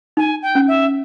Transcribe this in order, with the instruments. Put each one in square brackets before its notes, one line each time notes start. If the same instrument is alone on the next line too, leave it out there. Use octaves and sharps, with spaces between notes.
[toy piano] D#4 [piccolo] G#5
[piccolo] G5
[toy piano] C#4
[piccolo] E5